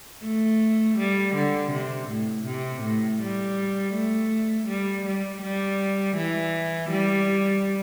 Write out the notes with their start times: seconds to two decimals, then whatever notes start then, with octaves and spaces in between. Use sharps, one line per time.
0.24 A3
0.98 G3
1.35 D3
1.72 C3
2.09 A2
2.46 C3
2.83 A2
3.21 G3
3.94 A3
4.68 G3
5.06 G3
5.42 G3
6.17 E3
6.91 G3